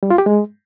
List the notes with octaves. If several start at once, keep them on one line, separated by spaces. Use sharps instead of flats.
G3
F4
G4
G#3